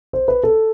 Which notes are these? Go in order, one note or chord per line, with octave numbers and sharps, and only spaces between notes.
C5
B4
A4